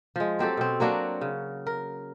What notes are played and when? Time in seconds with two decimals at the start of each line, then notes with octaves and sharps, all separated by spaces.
0.16 F3 G#3
0.39 F#3 C4 G4 A4
0.57 B2 C4
0.80 F#3 A#3 D4 F#4
1.21 C#3
1.67 A#4